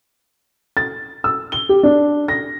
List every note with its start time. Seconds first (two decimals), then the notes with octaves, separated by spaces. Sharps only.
0.77 A6
1.24 E6
1.52 G7
1.69 G4
1.83 D4
2.28 A#6